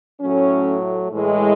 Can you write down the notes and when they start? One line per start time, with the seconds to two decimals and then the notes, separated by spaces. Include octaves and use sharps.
0.20 A2 F#3 A3 C#4
1.13 A2 E3 G#3